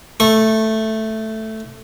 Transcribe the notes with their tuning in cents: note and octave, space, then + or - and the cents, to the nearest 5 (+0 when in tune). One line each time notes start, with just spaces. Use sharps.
A3 +0 C#6 -25